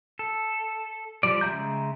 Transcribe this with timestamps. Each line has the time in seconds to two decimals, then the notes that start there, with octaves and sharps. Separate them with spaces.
0.19 A4
1.23 F3 G3 D5
1.41 C#3 G#3 E5 A#5 G6